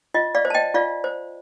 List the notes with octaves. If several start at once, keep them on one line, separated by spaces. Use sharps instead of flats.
F4 D#5
D5 F5
C5
A5
D#5 G5
F4 D5 F5
C5